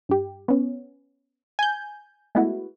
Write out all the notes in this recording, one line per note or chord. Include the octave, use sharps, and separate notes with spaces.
G2 G4
B3 C#4
G#5 G6
G#3 A3 B3 E4 F#4